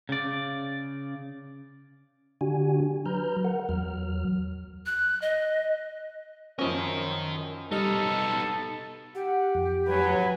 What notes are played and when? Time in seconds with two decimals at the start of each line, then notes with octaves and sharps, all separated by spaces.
0.09 C#3 D5
2.41 D3 D4 F#4 G4 G#5
3.06 F#3 B4 A#5 F6 G6
3.44 A#4 F#5
3.69 E2 F#3 F6
4.86 F#6
5.22 D#5
6.59 F#2 F3 C#4 A#4 D#5
7.72 G3 B3 D#4 A4 D#5 F6
9.15 G4 F#5
9.55 F2
9.88 F#3 B4 G#5